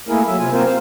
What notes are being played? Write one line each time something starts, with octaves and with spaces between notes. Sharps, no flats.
A3 A#3 E4 G#4 A#4
F#3 E5
C3 F4 G#5
C3 A#3 C4 F4 A#4 C5
C5 F5